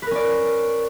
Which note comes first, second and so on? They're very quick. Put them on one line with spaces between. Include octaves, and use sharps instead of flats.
B4 A#4 C#4 D5